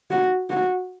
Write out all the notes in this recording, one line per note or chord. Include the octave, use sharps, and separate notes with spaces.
F#4
F#4